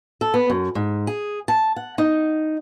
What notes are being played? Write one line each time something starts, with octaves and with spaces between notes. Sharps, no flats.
A4
B3
F#2
G#2
G#4
A5
F#5
D#4